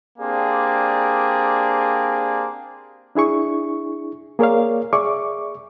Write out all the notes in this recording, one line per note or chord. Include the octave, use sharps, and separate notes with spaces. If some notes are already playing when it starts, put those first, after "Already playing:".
A#3 C4 D4 G4 G#4 D5
D4 E4 G#4 C#6
A#3 G#4 A#4 C#5 D5 F5
G#4 D5 E5 C#6 D6